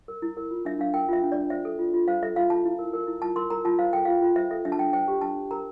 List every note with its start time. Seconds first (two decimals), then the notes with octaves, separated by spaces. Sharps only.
0.08 A#4
0.22 E4
0.37 A#4
0.51 F4
0.65 D4 E5
0.79 D4 F5
0.94 A#4 G5
1.09 F4 E5
1.23 D4
1.32 D5
1.37 D4
1.50 C5 E5
1.65 A4
1.79 F4
1.94 F4
2.08 C5 F5
2.23 A4 E5
2.36 F4 F5
2.50 F4 A5
2.65 E4
2.79 A#4
2.93 A#4
3.07 E4
3.22 F4 A5
3.36 A#4 C6
3.50 A#4 A#5
3.64 F4 A5
3.79 C5 F5
3.93 A4 G5
4.05 F4 F5
4.22 F4
4.36 C5 E5
4.51 A4 E5
4.65 D4 E5
4.72 A5
4.79 D4 G5
4.93 C5 G5
5.08 G4
5.21 D4 A5
5.36 D4
5.51 A#4 A#5